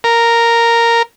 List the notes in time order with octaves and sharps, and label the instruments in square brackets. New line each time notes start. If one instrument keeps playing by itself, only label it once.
[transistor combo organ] A#4